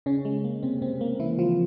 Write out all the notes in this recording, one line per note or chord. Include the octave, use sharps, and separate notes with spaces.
C#3 C#4
G#3
A#3
C3 C4
C3 C4
A#3
E3 E4
F3 F4